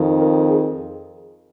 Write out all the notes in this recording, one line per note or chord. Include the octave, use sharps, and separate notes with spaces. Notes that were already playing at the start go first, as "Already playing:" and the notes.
Already playing: F2 D#3
A#4
G#4